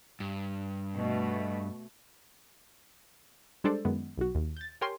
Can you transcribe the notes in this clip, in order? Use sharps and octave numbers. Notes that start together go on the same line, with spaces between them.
G2
B2 A3
G3 G#3 D4 A4 C5 D5
F#2 D#3 G#3 B3
B1 F#4
D#2
G6 A6
G4 A#4 C#5 G5 G#5 C6